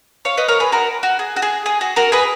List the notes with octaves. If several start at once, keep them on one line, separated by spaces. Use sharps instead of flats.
C#5 F5
B4 D#5
A#4 C#5
G#4 B4
F#4 A#4
F#4
G#4
F#4
G#4
G#4
F#4
F#4 A#4
G#4 B4